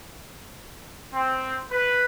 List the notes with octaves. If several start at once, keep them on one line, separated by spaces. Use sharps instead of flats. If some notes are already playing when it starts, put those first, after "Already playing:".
C4
B4